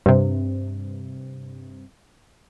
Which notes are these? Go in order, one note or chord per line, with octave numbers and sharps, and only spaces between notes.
G2 C3